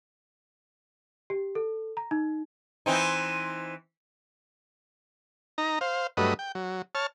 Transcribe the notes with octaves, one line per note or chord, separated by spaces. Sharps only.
G4
A4
A#5
D#4
E3 C4 D#4
D#4 A#5
C5 F5
G2 F#3 A3 B4 D#5
G5
F#3
C#5 A5 F6